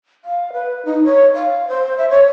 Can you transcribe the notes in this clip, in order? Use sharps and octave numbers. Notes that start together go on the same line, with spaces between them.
F5
B4
D#4
C#5
F5
C5
E5
C#5